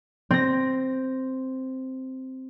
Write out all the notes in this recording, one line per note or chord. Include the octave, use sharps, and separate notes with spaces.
C4 A#6